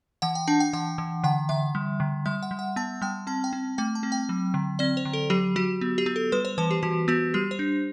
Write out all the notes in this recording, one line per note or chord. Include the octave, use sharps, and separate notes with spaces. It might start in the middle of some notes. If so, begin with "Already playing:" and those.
E3 F#5
G5
D4 A5
G5
E3 F#5
E3
D3 F#5
D3 E5
G3
D3
G3 E5
F#5
G3
F#5
B3 A5
G3 G5
C4 A5
G5
C4
A3 G5
A5
C4
G5
F#3
D3
C4 D5
C5
D3
A4
F#3 G4
F#3 F#4
B3
G4
B3
A4
G3 B4
C5
E3 B4
G4
E3 F#4
B3 F#4
G3 G4
C5
D4